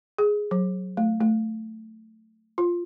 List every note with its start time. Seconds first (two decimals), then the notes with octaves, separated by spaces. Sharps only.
0.18 G#4
0.51 F#3
0.97 A3
1.21 A3
2.58 F4